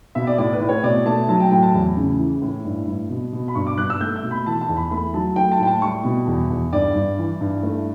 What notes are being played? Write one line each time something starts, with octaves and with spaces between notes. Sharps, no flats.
B2 E5
D5
A2 D5
B4
A2
C#5
B2 D5
A3 A5
F#3 A5
G5
A2 G5
A5
E2
C#3
E3
A2
G2
G2
B2
B2
B5
G2 C#6
D6
G2 F#6
E6
A3 G6
G6
B2
B5
E3 A5
A5
E2
B5
A3 B5
F#3 A5
A3 G5
A5
A2 G5
A5
G3 C#6
B2
E2
E2
G2 D5
G2
E3
G2
A3